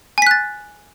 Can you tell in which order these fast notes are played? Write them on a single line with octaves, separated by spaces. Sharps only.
G#5 B6 F#6 A6